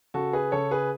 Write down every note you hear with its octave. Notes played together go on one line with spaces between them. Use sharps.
C#3 F#4 A4
G#4 B4
C#3 A4 C#5
G#4 B4